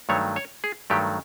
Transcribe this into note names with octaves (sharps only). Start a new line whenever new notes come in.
G2 D#3 F#3 A3 C#5
C#5
G#4
G2 D#3 F#3 A3 G4